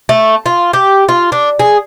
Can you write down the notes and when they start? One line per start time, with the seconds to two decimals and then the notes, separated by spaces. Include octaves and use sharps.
0.09 A3
0.46 F4
0.73 G4
1.08 F4
1.32 D4
1.59 G#4